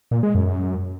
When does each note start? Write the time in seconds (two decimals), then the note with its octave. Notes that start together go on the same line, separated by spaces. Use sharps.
0.11 A#2
0.23 G#3
0.35 F#2